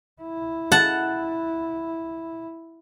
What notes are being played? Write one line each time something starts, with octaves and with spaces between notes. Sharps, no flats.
E4
F#5 A5